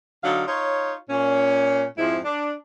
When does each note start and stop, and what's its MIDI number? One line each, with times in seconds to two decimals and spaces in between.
0.24 0.43 50
0.24 0.43 54
0.24 0.43 63
0.24 0.43 77
0.47 0.93 63
0.47 0.93 65
0.47 0.93 73
1.10 1.85 46
1.10 1.85 61
1.98 2.19 41
1.98 2.19 44
1.98 2.19 53
1.98 2.19 56
1.98 2.19 64
2.25 2.53 62